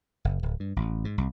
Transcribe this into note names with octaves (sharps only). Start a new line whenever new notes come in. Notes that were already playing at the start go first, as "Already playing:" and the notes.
F#1
D1
G2
A1
G#2
C2